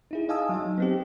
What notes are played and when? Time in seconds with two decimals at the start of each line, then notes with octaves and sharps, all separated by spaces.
0.11 D#4 E4 G#4
0.29 D#5 F5 G#5 A5 D#6 E6
0.49 F#3 D#4 D#5
0.78 B3 C4 G4